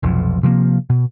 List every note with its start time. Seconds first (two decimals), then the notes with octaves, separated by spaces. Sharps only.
0.03 F1 B1 F2
0.43 C3 F3 G3 A#3
0.90 B2